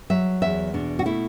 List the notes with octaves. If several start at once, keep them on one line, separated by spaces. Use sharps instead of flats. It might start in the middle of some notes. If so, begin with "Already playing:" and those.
F#3 E5
E2 E5
B2 D4
F#4
A3 E4